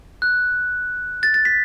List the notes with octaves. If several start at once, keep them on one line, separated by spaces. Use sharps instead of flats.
F#6
A6
A6
B6